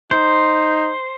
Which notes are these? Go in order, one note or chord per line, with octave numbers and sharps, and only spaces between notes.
D#4 C5